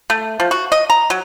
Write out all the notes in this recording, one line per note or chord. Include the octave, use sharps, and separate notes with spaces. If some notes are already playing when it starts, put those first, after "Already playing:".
A3
F3
F#4
D#5
A#5
F#3